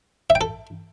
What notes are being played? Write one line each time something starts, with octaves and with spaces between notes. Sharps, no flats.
E5
G5
A4